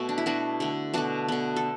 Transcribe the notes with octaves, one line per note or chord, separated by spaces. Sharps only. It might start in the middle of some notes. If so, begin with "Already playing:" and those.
Already playing: B2 A3 B3 F#4
D4
E4
B2 B3 D4 F#4
D3 A3
B2 A3 D4 F#4
D3 B3
A4